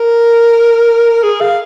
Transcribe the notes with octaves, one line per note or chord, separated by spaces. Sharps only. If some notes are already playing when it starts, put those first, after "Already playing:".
Already playing: A#4
G#4
F5